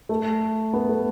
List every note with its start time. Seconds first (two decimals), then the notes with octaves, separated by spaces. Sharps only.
0.09 A3
0.73 B3
0.89 A3